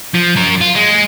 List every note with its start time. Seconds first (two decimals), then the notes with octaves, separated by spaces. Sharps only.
0.14 F3
0.36 F#3 A#4
0.61 F4
0.75 G#3